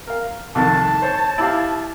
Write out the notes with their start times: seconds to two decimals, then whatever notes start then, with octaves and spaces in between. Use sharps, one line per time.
0.07 A#4 F5
0.55 C2 F2 D#3 A5
1.02 C5 C#5
1.38 E4 G4 F5